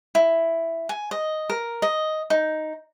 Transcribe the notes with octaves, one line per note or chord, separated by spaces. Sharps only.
E4
G#5
D#5
A#4
D#5
D#4